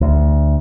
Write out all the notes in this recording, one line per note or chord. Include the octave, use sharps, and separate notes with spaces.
D2